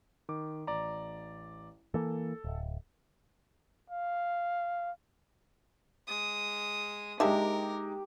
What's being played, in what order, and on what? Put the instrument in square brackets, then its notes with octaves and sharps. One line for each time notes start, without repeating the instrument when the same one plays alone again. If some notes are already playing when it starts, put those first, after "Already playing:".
[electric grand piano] D#3 D6
A1 D5 A#5
[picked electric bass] E3 A#3 [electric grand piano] A4
[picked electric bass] D1
[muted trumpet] F5
[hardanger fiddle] G#3 D#6
[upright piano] G#3 D#4 [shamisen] A#3 D4 E5 [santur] G4 [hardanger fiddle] A#4